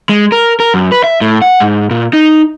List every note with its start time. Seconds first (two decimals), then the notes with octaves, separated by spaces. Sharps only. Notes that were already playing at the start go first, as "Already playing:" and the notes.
0.09 G#3
0.32 A#4
0.60 A#4
0.74 F#2
0.92 B4
1.04 E5
1.21 A2
1.42 F#5
1.60 G#2
1.91 A#2
2.13 D#4